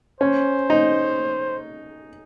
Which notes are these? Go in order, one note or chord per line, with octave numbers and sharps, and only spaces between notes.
C#4 C5
D#4